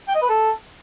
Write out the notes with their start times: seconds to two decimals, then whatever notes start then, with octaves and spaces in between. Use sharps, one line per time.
0.08 G5
0.15 D#5
0.22 B4
0.29 A4